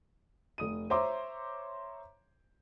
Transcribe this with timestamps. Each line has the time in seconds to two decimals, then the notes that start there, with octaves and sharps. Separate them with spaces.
0.58 F1 D#6 D#7
0.90 C5 C#5 E5 A#5 C6 D6